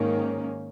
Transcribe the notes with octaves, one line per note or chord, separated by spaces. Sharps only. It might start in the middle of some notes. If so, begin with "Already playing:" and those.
Already playing: G#2 D#3 A#3 C#4